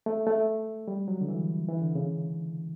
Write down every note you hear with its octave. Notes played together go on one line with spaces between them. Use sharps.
A3
A3
G3
F#3
D3
E3
E3
D3
C#3